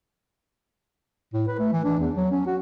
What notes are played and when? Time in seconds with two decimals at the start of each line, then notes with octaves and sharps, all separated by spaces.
1.34 A2
1.48 B4
1.59 A3
1.73 E3
1.84 D4
2.00 E2
2.16 F#3
2.31 C#4
2.47 F#4